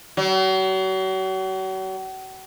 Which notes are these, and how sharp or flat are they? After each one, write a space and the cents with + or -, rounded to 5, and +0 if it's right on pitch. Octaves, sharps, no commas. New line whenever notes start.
F#3 +40